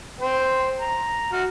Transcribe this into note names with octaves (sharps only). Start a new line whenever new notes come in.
C5 G5
A#5
F#4 F6